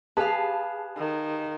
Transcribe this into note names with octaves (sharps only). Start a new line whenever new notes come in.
G4 G#4 B4 F5 A5
D#3